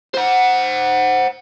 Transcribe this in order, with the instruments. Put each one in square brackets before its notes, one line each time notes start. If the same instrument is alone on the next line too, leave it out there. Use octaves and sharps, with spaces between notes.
[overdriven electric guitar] C5 F#5